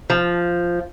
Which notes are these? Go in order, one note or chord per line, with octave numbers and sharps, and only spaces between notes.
F3